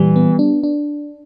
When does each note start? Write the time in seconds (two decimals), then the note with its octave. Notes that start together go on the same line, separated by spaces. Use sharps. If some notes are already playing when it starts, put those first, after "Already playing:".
Already playing: A#2 E3 G3
0.16 B3
0.39 D4
0.63 D4